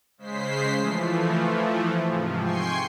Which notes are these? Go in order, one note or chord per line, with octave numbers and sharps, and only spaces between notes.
C#3 G#3 C5 B6 C7
E3 F3 A3
G#2 C3 F3
G5 G#5 C6 C#6 C7